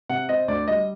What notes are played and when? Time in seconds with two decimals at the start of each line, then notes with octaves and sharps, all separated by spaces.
0.09 C3 F#5
0.29 C4 D#5
0.48 D2 D5
0.68 G3 D#5